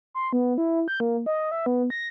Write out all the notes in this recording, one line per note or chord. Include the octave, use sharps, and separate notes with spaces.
C6
B3
E4
G6
A#3
D#5
E5
B3
A#6